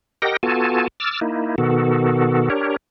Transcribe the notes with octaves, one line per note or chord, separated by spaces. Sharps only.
G4 A#4 D#5 F#5 G5 A#6
B3 F4 F#4 A4 G#5 A5
D6 E6 F6 A6
A#3 D#4 E4
B2 D#3 B3 F#4 A4
D4 G4 A#4 C#5